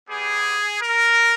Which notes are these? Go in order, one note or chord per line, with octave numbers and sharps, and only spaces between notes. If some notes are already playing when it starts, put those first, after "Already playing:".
G3 B3 G4 G#4
A#4